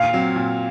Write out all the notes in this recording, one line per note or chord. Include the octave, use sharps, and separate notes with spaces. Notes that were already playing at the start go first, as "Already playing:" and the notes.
Already playing: A#2 F5
F#3 C4
A#2